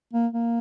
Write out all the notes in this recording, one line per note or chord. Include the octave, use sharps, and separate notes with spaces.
A#3
A#3